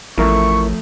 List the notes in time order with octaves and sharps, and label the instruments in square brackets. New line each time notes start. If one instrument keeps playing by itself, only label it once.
[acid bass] A1 [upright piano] F2 A3 [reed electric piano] E4 A#4 E5 [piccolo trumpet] C#6